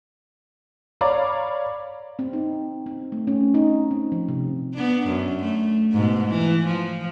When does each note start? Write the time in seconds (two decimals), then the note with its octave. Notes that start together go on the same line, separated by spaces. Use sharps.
1.01 C#5 D5 F5 A#5 B5
2.19 C4
2.33 D#4
2.86 C4
3.12 A3
3.27 C#4
3.54 D#4
3.91 C4
4.12 F3
4.29 C3
4.74 B3 D4
5.08 F#2
5.40 A3
5.92 G#2 B2
6.28 E3
6.66 F3